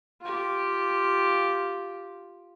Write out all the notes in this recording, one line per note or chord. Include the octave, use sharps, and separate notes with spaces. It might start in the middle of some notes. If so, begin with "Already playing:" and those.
F4 G4